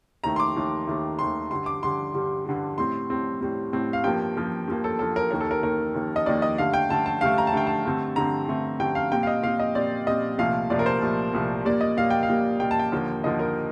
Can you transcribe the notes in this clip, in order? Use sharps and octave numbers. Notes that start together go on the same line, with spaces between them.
D#2 D#3 A3 A#5
C6
D6
D#2 D#3 A3
D#2 D#3 A3
D#2 D#3 A3 C6
G2 D3 G3 C6
D6
G2 D3 G3 C6
G2 D3 G3
G2 D3 G3
A2 G3 C4 C6
A2 G3 C4
A2 G3 C4
A2 G3 C4
F5
G2 F3 A#3 G5
G2 F3 A#3
G2 F3 A#3
A4
G2 F3 A#3 A4
A#4
D#2 D#3 A#3 A#4
A4
A#4
D#2 D#3 A#3 A#4
D#2 D#3 A#3
D#5
D#2 D#3 A#3 D5
D#5
G2 D3 A3 F5
G5
G2 D3 A3 A5
A5
G2 D3 A3 F5
A#5
A5
G2 D3 A3 G5
A5
G2 D3 A3 C4
G2 D3 A3 C4 A#5
G2 D3 A3 C4
G2 D3 A3 C4 G5
F5
A#2 G3 C4 G5
F5
D#5
A#2 G3 C4 F5
D#5
A#2 G3 C4 D5
A#2 G3 C4 D#5
C2 A#2 F3 A3 F5
C2 A#2 F3 A3 D5
A#4
C5
C2 A#2 F3 A3
C2 A#2 F3 A3
A#2 G3 A#3 D5
D#5
A#2 G3 A#3 F5
G5
F5
A#2 G3 A#3
A#2 G3 A#3 G5
A5
G5
D#2 D3 F3 A#3
D#2 D3 F3 A#3 D#5
A#4